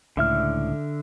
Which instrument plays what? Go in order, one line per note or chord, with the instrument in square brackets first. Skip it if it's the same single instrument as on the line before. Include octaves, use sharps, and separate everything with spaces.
[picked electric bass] C#2 A2 [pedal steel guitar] D3 E5 F6